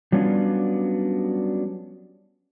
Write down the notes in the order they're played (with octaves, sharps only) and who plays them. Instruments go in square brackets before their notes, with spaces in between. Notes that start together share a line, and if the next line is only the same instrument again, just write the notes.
[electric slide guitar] F#3 G3 B3 C#4 D4 F4